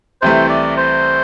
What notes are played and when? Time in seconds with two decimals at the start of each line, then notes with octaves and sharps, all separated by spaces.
0.22 C2 C3 E3 A3 C5
0.49 D5
0.77 C5